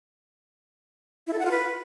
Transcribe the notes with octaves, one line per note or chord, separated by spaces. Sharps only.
E4
A4
F#5
F4
B4